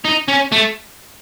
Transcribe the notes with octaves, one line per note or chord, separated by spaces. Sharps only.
D#4
C#4
A3